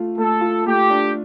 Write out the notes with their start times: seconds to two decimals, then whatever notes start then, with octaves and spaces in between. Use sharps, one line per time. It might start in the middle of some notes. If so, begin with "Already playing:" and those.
Already playing: A3 F4
0.17 A3 A4
0.41 F4
0.66 A3 G4
0.90 D4